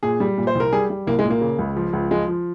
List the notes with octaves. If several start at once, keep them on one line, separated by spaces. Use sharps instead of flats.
A#2 G#4
G3
A#2
C5
C2
A#4
G3 G#4
G3
C2 A#3
G#3
A#2
A#3
C#3
C#2
F3
C#2
F3 G#3
F3